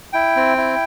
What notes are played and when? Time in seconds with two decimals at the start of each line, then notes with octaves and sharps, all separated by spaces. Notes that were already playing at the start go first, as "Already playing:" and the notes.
0.13 E4 G5
0.36 C4
0.58 E4